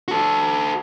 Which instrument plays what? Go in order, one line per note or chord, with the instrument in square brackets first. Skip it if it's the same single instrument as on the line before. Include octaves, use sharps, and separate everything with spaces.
[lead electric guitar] F#4 A4